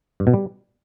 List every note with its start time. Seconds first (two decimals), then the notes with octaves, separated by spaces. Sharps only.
0.20 G2
0.27 B2
0.34 G3